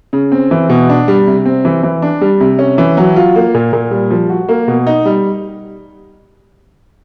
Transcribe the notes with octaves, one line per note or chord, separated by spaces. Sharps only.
C#3
C4
E3
B2
D4
G3
C3
C4
E3
E3
D4
G3
C3
C#4
E3
F#3
F4
A#3
A#2
A#2
G3
F3
F#4
A#3
B2
D#4
G3